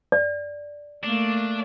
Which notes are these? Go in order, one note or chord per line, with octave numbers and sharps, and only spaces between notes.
D5
A3 A#3 D4